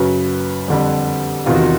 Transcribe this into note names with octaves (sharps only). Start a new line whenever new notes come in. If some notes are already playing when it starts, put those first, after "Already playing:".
Already playing: F#2 C#3 F#3 B4
F2 D3 G3
E2 C3 D#3 F4
F#4
F4